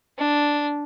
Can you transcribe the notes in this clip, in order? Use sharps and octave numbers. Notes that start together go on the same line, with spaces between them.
D4